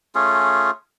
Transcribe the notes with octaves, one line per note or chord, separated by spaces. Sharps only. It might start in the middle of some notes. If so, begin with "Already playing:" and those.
A3 C#4 F4 G#4